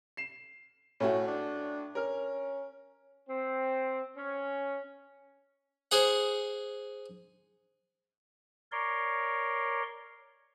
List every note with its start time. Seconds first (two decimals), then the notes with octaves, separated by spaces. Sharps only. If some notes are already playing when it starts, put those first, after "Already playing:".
0.17 C7 E7
1.00 A2 A3 C#4 F#4
1.27 D4
1.95 C#4 A#4 F6
3.29 C4
4.16 C#4
5.91 G#4 C5 F#5
8.72 A#4 C#5 D5 C6